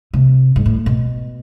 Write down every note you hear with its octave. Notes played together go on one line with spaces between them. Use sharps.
C3
G#2
A2
B2